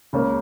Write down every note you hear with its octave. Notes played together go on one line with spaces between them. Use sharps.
C#2 C#3 A#3 C#4